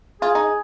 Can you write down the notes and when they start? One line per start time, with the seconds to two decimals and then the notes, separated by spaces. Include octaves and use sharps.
0.21 F4 G#4
0.35 D#4